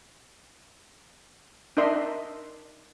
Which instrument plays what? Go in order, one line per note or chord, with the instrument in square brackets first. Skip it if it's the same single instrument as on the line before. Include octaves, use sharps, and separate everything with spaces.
[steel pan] D4 D#4 A#4 D#5 E5 C6